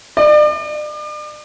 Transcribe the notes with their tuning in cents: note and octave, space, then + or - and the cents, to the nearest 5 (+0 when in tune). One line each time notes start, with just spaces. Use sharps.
D5 +40